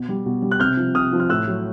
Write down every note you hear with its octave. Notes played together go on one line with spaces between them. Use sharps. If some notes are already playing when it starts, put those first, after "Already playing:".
Already playing: B2
G3
B2
G3
F#6
C3 F6 G6
F3
C3 D#6 F6
F3
F6
A2 E6 F#6
F#3